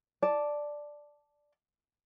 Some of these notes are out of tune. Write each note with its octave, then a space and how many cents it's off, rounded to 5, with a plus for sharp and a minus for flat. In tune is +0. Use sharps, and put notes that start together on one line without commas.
D5 +0 A5 -5